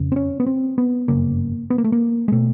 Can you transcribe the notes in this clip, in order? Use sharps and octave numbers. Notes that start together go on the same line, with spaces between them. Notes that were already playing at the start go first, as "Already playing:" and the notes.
Already playing: F2 C#3
C4
C#4
B3
C4
B3
G1 F#2 C#3 A#3
B3
A#3
A3
A#3
G#3
B2 A3